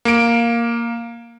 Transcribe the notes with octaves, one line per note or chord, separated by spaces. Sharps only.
A#3 D7